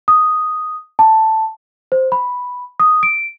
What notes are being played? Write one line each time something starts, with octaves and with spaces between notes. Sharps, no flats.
D#6
A5
C5
B5
D#6
D7